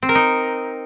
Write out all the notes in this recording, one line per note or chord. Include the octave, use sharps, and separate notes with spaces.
C4
A#4
D#4